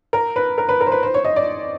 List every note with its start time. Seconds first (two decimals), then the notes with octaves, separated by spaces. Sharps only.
0.13 A#4
0.36 B4
0.58 A#4
0.69 B4
0.81 A#4
0.86 C5
0.92 B4
1.03 C5
1.14 C#5
1.25 D#5
1.36 D5